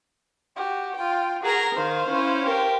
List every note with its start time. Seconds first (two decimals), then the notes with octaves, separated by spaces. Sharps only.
0.56 F#4 G4
0.96 F4 G5
1.43 F#4 G#4 A#4 A#5
1.75 D#3 C5 F5
2.08 C#4 E4
2.45 G4 A#4